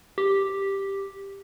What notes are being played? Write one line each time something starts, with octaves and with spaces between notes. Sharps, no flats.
G4